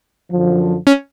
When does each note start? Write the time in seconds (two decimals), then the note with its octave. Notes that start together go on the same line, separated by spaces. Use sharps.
0.31 F#2 D3 F3
0.87 C#4